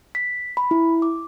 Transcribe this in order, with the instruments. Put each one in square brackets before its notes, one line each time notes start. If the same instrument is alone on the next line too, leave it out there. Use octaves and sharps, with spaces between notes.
[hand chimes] B6
B5
E4
D6